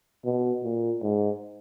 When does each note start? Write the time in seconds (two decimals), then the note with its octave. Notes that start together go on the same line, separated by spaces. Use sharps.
0.25 B2
0.64 A#2
1.02 G#2